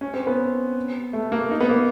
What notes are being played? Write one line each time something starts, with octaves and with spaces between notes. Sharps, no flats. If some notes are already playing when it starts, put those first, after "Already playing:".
C#4
C4
B3
A3
A#3
D#4
B3
A#3